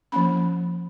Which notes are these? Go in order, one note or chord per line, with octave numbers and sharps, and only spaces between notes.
F3 A#3 C#4 B5